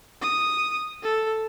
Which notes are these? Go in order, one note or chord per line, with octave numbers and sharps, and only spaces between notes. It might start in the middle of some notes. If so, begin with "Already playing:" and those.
D#6
A4